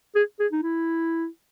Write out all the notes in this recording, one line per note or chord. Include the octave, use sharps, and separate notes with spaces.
G#4
G#4
D#4
E4